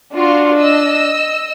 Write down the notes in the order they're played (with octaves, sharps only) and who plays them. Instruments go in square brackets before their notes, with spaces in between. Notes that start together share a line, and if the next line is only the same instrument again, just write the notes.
[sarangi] D4 [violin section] F4 F#4
[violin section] D#5 E6